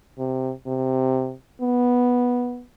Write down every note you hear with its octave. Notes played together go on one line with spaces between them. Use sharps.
C3
C3
B3